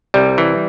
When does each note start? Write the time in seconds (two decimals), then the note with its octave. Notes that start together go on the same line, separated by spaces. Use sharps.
0.14 C2 G3
0.38 E3